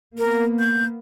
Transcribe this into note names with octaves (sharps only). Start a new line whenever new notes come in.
A#3 B3 A#4
G6